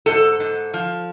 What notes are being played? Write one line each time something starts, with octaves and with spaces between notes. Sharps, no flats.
G#2 A4
G#2
F3